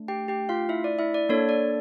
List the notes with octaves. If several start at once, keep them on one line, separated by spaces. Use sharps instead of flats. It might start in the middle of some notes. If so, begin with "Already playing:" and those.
Already playing: A3 D4
G4 G5
G4 G5
F4 F5
E4 E5
D5
E4 E5
D5
A#3 D4 A4 C#5
D5